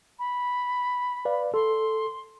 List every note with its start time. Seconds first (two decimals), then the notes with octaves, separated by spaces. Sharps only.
0.19 B5
1.25 B4 D5 F5
1.54 A4 C6